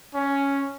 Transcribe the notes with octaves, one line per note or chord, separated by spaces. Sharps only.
C#4